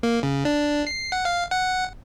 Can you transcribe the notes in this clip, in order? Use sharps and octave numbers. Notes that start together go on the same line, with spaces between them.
A#3
C#3
D4
C7
F#5
F5
F#5